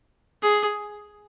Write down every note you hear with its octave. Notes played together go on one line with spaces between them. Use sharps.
G#4